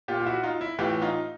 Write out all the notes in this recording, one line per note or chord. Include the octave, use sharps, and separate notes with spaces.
A#2 F4 G4
F4
E4 F#4
D#4 F4
E4
A2 E3 F4 G4
D#4 F4